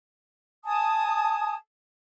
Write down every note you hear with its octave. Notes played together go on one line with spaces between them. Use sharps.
G#5 A5 D#6